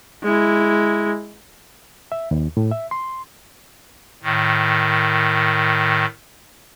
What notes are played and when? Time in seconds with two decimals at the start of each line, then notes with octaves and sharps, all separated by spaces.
0.23 G#3 E4
2.12 E5
2.31 D#2
2.57 A2
2.71 E5
2.91 C6
4.23 A2 D#3